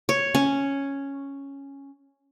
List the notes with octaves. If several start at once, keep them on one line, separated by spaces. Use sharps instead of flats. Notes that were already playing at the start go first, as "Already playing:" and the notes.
C#5
C#4